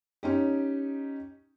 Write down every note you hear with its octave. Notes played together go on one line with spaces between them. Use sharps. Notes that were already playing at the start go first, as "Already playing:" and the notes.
C#4 D#4 G4